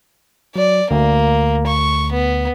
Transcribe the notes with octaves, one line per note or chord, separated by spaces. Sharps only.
F#3 D5
D2 A#3
C#6
B3